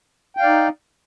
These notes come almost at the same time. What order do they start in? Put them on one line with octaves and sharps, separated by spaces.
G5 F5 D5 D#4